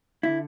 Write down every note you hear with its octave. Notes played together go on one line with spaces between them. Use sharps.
D3 E4